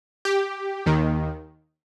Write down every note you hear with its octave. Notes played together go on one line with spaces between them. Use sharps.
G4
D#2 D#3